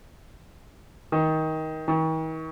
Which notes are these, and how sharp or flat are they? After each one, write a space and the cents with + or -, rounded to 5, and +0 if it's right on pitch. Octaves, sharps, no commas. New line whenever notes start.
D#3 +20
D#3 +45